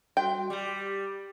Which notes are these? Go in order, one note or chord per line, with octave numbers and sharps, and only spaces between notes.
G3 F#4 G5 C6
G3 G4 D6